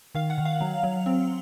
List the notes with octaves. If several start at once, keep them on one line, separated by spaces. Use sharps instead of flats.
D#3 F5
F#5
D#3
F5
F#3
F#3
C4